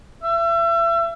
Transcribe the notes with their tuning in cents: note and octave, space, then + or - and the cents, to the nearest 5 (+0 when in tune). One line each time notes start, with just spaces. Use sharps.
E5 +35